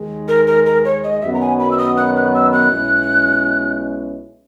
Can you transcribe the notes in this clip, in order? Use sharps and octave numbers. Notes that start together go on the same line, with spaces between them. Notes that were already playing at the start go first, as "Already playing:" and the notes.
Already playing: D#2 D#3 G#3
A#4
A#4
A#4
C#5
D#5
F#2 D#3 F#3 B3 F#4 E5
A#5
G#5
B5
E6
D#6
F#6
F#6
E6
F#6
B1 B2 G#3 C#4 E4